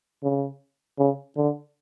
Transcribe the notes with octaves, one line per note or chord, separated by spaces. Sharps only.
C#3
C#3
D3